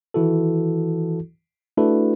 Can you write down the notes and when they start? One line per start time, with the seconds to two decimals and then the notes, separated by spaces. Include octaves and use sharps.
0.14 D#3 E3 E4 F#4 A4
1.77 A3 D4 E4 F#4 A4 B4